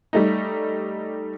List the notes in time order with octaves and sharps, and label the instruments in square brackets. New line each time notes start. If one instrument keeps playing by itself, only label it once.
[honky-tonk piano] G3 A3 D#4